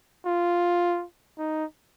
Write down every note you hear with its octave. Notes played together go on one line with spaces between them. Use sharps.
F4
D#4